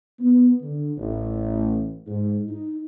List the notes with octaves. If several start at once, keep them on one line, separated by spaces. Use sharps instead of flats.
B3
D3
A1
G#2
D#4